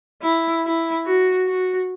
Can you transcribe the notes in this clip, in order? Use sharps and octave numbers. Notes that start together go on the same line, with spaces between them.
E4
E4
F#4
F#4